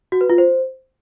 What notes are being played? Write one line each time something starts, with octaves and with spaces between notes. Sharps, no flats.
F#4
B4
F4
C5